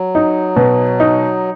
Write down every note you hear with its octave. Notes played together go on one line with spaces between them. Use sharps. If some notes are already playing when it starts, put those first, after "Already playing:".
Already playing: F#3
D#4
B2
D#4